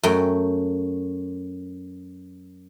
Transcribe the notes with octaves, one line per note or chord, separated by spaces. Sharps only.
F#2 A3 G5